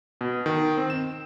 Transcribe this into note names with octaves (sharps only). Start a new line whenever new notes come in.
B2
D#3
C4
E7